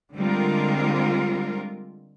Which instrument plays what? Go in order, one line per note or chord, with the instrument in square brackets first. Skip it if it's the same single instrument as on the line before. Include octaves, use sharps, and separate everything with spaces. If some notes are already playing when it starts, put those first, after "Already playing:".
[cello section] D3 G3 G#3 C4 F4 A#4